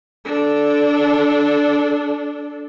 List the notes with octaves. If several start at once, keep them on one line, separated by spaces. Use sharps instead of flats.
D4 A4